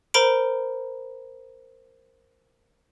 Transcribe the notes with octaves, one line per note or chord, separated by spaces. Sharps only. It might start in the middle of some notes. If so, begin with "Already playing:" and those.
A#4 C5 A#5 B5 D7